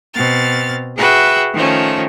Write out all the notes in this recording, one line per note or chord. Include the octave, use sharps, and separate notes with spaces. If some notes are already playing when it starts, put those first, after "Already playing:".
B2 C4 F6 A6
F#4 G#4 B4 E5 G5
D#3 F3 A3 C#4